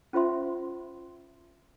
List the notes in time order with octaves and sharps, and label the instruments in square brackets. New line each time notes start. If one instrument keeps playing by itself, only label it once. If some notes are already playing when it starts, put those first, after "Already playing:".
[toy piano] C#4 F4 C5 E5 C6